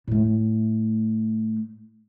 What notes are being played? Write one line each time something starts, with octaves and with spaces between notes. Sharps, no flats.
A2 A3